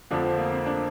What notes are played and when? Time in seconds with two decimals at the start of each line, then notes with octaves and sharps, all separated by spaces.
0.11 F2 D3 F3 D4
0.24 C4
0.38 A#3
0.51 C4
0.66 D4